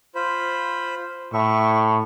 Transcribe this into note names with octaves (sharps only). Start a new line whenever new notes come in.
F4 C5 B5
A2 E5 C#6